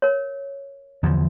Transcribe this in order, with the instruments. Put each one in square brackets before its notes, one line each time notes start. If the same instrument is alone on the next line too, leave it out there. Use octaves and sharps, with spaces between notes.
[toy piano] A#4 C#5
[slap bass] E2 D3 F3